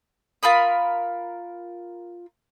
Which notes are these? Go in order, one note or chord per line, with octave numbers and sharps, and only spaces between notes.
F4 A#4 B5 D#6